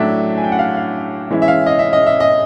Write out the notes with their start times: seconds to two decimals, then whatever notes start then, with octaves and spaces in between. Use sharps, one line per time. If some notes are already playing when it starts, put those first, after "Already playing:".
Already playing: A2 F#3 A3 D4 E5
0.38 G#5
0.44 G5
0.52 F#5
0.59 F5
0.77 F5
1.31 E3 G#3 C#4 E4
1.42 E5
1.48 F5
1.66 D#5
1.79 E5
1.93 D#5
2.06 E5
2.20 D#5